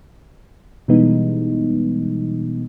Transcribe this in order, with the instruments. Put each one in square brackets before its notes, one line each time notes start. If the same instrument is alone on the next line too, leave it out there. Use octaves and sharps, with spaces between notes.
[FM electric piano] B2 E3 G3 G#3 B3 D#4